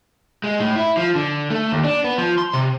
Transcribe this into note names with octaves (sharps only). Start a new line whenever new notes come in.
G#3
A2
E4
F3
D3
A3
D#2
D4
B3
F3
C6
C3